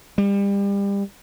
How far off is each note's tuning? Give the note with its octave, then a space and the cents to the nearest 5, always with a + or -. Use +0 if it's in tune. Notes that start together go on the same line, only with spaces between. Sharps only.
G3 +30